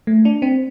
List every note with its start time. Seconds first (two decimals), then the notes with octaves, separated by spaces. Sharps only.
0.07 A3
0.25 D4
0.42 C4